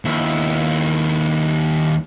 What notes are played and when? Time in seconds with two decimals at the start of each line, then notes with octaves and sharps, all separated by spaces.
0.05 D#2 E4